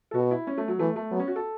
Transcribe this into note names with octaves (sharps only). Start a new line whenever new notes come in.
A4
B2 F#4
E4
C#4
A3
F#3
E3 A3
A3
F#3 B3
C#4
F#4
A4